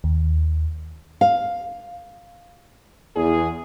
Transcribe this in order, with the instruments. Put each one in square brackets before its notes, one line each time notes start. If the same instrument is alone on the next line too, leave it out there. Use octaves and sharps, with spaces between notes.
[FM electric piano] D#2
[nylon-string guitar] F5
[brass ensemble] E2 G#4